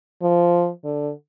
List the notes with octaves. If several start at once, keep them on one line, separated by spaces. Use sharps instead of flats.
F3
D3